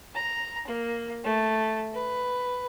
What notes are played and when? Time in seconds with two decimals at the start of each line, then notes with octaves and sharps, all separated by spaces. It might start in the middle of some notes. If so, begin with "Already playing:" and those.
0.15 A#5
0.67 A#3
1.24 A3
1.94 B4